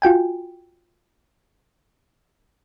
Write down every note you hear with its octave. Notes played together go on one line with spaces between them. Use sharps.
F4 F#4 G5 G#5